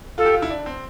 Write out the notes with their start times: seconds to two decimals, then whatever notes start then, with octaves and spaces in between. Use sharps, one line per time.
0.18 F4 A4
0.26 G4
0.33 F4
0.42 E4
0.50 D4
0.66 C4